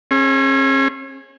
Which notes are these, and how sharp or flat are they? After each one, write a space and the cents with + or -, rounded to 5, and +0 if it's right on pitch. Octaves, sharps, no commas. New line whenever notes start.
C#4 -45 G#4 +0